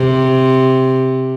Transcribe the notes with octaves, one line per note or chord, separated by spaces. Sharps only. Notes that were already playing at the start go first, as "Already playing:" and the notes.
Already playing: C3